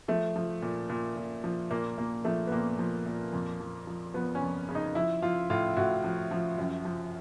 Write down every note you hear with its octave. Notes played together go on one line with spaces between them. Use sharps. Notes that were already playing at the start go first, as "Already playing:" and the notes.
F3 A3
F3
A#2
A#2
A#2
F3
A#2 A#3
A#2 A#3
F3 A3
B3
A#2 A#3
F3
A#2
F2
F3
F3
F3 B3
C#4
F2
C#3
D#4
F3 E4
F3 F4
A2 F4
A2 F#4
F3
F3
F#2
F3